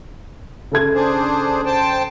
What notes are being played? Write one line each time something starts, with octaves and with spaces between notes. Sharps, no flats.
C#3 A4 G#6
D4 G#4 C5
C5 G5 A5